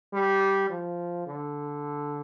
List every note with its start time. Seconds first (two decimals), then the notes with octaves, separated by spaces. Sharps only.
0.14 G3
0.70 F3
1.26 D3